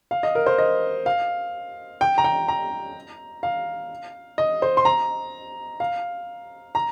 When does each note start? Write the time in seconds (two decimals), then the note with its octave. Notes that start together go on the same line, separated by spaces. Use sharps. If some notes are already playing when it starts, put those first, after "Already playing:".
0.11 F5
0.23 D#5
0.35 A#4
0.46 C5
0.58 D#5
1.06 F5
2.01 G5
2.18 A#5
2.24 G5
2.48 A#5
3.43 F5
4.38 D#5
4.62 C5
4.77 C6
4.85 A#5
5.80 F5
6.75 A#5